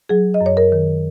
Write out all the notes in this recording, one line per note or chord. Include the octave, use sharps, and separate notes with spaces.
F#3 G#4
D#5
F#2
C#5
A#4
D#3